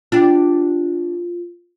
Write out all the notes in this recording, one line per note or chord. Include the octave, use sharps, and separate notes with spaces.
D4 F4 G4